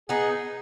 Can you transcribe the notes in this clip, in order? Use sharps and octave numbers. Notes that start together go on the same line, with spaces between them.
B3 D#4 G#4